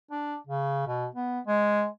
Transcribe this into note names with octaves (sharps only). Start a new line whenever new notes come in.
D4
C#3
B2
B3
G#3